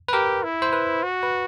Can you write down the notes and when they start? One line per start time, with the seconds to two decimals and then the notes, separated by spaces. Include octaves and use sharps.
0.08 B4
0.13 G4 A#4
0.44 E4
0.62 C5
0.73 B4
1.03 F#4
1.23 B4